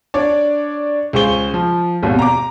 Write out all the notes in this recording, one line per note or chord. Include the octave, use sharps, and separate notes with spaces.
D4 C#5 D5 D6
C#2 G#4 C5 C#6 G7
F3
G#1 D#2 B2
A#5 D6